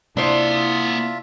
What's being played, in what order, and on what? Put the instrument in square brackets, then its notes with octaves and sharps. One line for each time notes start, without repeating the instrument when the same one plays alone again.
[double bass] C3 E4 [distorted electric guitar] A#3 F#5 [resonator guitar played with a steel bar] D4 C5 [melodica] F4 E5